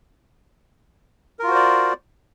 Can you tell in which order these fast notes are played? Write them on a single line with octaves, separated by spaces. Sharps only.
A#4 F4 F#4 C5 D5